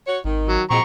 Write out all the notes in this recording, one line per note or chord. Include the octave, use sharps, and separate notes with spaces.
F#4 C#5
G#1 D#3
F#3
A#2 F#3 G#3 C4 A#5 C#6